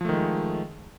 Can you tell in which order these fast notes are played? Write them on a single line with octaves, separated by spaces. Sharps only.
F3 A3 D#3 G#3